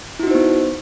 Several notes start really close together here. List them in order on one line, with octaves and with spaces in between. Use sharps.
E4 F#4 D#4 C5 B3